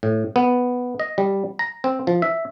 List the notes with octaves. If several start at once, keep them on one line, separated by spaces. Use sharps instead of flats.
A2
B3
D#5
G3
A#5
C4
F3
E5